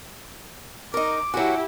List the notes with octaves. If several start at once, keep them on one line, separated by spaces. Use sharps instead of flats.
D#4 A#4 D6
F#3 E4 F#4 G4 F#5 G#5